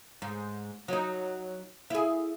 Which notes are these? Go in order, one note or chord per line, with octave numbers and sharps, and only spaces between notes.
G#2
F#3 D#4
E4 G#4